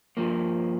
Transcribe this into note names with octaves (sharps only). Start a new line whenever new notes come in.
G2 F3 A#3